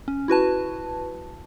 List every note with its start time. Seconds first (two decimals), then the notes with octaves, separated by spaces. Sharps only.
0.08 C#4
0.28 E4 F#4 B4 A5